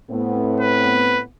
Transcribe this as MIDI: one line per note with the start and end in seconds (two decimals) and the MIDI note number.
0.11 1.23 45
0.11 1.23 59
0.11 1.23 60
0.61 1.22 71